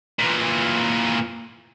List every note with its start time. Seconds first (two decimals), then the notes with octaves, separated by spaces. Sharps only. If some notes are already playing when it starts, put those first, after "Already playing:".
0.19 A#2 E3